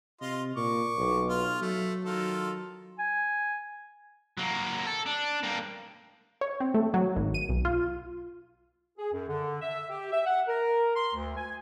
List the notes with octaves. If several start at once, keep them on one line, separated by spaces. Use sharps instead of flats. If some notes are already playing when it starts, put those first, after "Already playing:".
C3 F4 D#5 C6
A#2 C#6 D6
B1
F4 F6
F#3 A3
D#3 F4 A4
G#5
F#3 A#3
A4
D4
G3 A#3
C#5
C4
A3
F#3
G#1
D#7
B1
F4
G#4
F#2
D3
E5
G4
E5
F#5
A#4
C6
D2
G#5